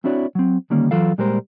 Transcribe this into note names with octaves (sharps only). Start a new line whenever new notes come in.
C4 D4 E4 F#4 C#5 D5
F#3 C4
D3 D#3 G3 A#3 C#4
E3 F#3 F4 A4 F5
A#2 G3 G#3 G4 A#4 C5